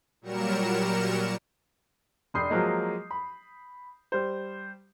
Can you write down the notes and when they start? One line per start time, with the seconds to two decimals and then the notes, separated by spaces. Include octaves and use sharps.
0.21 A#2 F#3 G3 A#4 C#7 E7
2.34 F1 D4 B5 D#6 G6 C7
2.50 F3 F#3 G#3 A#3 D#5
3.11 B5
4.12 G3 C5